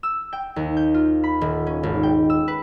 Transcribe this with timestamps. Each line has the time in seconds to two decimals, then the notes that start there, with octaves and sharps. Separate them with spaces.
0.03 E6
0.33 G5
0.56 D#2
0.77 G6
0.94 F4
1.24 B5
1.41 D#1
1.67 C#4
1.83 G#1
2.03 G5
2.30 E6
2.48 B4